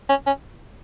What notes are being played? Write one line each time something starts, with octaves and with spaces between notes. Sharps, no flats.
C#4
C#4